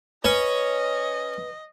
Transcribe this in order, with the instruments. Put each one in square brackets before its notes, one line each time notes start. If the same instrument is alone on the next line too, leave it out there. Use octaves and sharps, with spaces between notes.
[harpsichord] C#4 C#5 [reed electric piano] B4 [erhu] D#5